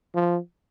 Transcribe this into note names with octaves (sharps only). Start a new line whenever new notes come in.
F3